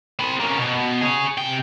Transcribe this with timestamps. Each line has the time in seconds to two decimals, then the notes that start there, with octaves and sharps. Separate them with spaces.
0.19 C4 B5
0.40 A#3 C#4
0.58 B2
1.01 G#4 C#5
1.38 C3 G5